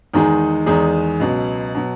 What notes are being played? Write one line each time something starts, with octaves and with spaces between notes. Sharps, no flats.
E2 D#3 G#3 D#4 G#4
E2 D#3 G#3 D#4 G#4
C#2 B2 F#3
B2 F#3